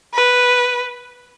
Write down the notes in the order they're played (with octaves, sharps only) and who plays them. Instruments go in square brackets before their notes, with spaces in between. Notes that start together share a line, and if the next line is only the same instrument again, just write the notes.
[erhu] B4